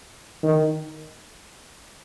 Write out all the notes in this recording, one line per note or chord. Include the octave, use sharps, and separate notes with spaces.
D#3